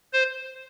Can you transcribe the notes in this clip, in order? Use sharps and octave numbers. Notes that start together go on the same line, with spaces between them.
C5